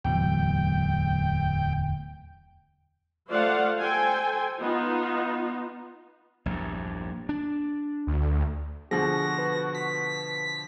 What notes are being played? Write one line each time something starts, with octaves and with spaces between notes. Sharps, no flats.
D1 E2 F#3 G5
A3 F4 C5 D5 F5 F#5
A4 C5 G5 G#5
B3 D#4 F4
A#1 E2 G2
D4
D2
B2 D3 F3 F#4 G#4 A#6
B4
B6